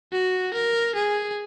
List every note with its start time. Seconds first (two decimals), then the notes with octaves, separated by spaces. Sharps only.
0.12 F#4
0.54 A#4
0.95 G#4